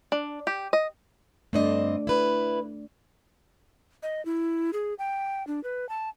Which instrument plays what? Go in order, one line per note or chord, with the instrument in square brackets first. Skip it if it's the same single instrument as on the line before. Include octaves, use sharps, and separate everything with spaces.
[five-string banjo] D4
G4
D#5
[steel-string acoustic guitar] G2 C4 D#5 [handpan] A3 D4 D5
[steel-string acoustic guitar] E4 B4
[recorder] D#5
E4
G#4
G5
D4
B4
A5